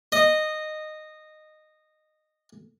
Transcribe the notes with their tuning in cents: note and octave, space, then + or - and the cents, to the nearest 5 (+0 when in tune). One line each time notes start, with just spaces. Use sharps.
D#5 -15